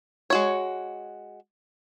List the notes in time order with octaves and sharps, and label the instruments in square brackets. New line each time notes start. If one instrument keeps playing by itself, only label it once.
[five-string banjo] G#3 F#4 C#5